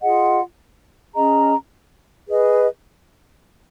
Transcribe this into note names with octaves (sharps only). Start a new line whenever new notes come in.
F4 G#4 D#5 F#5
C#4 G#4 D#5 A#5
G#4 B4 D#5